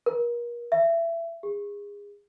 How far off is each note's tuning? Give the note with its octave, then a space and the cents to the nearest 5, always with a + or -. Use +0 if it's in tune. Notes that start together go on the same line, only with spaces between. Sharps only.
A#4 +35
E5 +25
G#4 -30